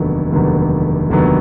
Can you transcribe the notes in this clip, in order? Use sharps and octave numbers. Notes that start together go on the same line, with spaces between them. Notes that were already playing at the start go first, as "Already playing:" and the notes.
Already playing: F1 D#2 D3 F#3 B3
F1 D#2 D3 F#3 B3
F1 D#2 D3 F#3 B3